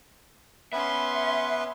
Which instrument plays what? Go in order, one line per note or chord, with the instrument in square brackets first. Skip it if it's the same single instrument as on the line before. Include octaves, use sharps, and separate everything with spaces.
[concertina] B3 B4 [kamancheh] C#4 C6 [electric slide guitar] E5